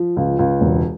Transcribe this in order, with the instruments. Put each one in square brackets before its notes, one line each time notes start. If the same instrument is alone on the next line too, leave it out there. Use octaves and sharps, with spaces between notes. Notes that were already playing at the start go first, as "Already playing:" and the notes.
Already playing: [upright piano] F3
C#2
C#2
E1